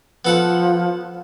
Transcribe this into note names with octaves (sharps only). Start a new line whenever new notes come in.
F3 B3 A4 F#5